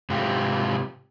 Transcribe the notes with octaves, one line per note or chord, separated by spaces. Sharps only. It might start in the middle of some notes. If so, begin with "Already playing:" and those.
G#2 C3 F4 G4